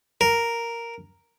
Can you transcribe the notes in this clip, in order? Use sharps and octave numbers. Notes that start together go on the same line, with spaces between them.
A#4